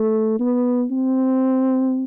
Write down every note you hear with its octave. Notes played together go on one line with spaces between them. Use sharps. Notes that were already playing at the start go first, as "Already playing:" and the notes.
Already playing: A3
B3
C4